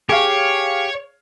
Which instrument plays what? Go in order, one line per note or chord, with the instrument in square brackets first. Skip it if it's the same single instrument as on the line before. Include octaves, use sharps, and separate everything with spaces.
[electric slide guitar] G4 [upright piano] G#4 F5 [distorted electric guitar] C#5